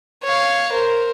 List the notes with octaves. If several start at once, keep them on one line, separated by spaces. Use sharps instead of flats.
C#5 F5
A#4 C5